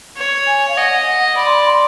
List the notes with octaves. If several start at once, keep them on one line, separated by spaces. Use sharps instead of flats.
C#5
G#5
F5
D#5 F#5
D5 B5
C6
B5
C6